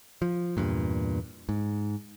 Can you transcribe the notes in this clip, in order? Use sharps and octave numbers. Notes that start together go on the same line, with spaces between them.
F3
E2 G2 A#2
G#2